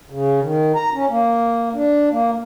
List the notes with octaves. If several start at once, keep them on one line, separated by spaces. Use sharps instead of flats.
C#3
D#3
A#5
C#4
A#3
D4
A#3